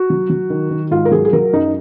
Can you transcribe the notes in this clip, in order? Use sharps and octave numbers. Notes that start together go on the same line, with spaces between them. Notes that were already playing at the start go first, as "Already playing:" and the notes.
Already playing: F#4
F#3
F#3
D#3
D#3
G#2 F4
A#4
F#3 G#4
G#4
F#3 A#4
F#2 D#4